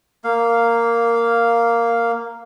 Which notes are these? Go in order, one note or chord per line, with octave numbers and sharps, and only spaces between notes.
A#3 F5